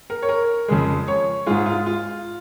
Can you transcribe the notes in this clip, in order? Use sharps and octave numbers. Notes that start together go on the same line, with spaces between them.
A#4
C#5
A#4
F2 C#3 G#3
C#5
G#2 G#3 F4
F4
F4